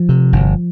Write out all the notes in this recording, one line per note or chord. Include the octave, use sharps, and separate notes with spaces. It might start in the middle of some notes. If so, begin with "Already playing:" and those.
Already playing: F3
C3
G1